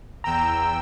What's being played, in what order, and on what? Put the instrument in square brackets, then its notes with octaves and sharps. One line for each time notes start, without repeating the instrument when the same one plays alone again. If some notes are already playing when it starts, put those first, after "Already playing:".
[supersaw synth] E2 G5 E6 [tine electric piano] A#5